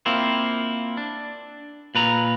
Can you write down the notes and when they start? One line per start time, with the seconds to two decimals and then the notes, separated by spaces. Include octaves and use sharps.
0.06 A#3 C4 E4 F4
0.97 D4
1.95 A#2 B4 A#5